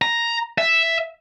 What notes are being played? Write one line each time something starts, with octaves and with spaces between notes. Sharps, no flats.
A#5
E5